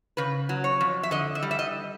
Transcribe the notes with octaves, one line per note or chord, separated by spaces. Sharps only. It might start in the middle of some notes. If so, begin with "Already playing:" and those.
C#3 B4
F#3
C#5
F2
E5
D3 D#5
E5
G3
E5
D#5